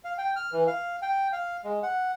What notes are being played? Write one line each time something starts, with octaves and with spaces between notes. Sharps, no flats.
F5
G5
F6
E3
F5
G5
F5
G#3
F#5